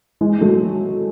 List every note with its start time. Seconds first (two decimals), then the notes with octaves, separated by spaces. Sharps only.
0.21 E3 G#3
0.41 F#3 A3